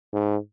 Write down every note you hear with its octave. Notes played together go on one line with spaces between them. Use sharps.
G#2